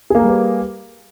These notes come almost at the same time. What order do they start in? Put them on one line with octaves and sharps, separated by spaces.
G#4 A#3 A#4 G3 B4